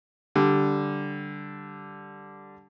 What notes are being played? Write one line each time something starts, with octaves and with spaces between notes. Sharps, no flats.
D3 G3